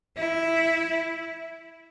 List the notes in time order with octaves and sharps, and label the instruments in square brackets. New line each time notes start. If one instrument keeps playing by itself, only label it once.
[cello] E4